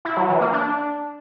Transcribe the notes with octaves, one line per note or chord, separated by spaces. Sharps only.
E4
F#3
E3
A#3
D4